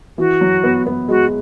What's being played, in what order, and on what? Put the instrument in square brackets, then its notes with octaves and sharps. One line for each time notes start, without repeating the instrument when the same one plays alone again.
[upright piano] E3 [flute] F#4
[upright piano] F#3
B3
B3
[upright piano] G#3 [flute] F#4